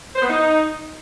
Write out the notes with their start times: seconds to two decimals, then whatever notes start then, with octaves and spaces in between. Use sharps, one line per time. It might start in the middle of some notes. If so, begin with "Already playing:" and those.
0.15 C5
0.22 B3
0.29 D#4